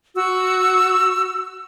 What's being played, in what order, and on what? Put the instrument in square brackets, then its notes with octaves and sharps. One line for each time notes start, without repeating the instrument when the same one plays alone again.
[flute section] F#4 E6